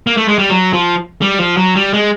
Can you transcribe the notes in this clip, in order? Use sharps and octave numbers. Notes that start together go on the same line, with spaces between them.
A#3
A3
G#3
G3
F#3
F3
G3
F3
F#3
G3
G#3